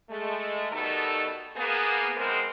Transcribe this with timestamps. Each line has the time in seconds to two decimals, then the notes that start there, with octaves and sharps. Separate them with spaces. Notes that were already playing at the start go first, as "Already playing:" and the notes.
0.10 G#3 A3
0.72 B2 D#3 G3 A3 D#4 A4
1.57 A#3 B3 G#4
2.16 E3 G#3 B3 C4 A#4 C5